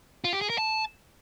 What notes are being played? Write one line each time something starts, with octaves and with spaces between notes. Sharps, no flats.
F4
G4
G#4
A#4
A5